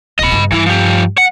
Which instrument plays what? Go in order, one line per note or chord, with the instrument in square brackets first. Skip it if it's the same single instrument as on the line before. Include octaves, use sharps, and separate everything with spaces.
[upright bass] D#1 C#3 [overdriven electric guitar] D#5 B5
[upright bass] G2 C#3
[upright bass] G2 [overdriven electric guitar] E3 E4
[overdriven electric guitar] F3 G4
F#5